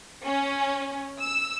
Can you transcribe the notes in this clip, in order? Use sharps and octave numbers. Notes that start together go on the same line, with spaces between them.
C#4
E6